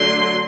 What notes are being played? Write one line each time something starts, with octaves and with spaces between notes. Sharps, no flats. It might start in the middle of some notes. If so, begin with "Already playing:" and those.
Already playing: D3 F#3 A3 C6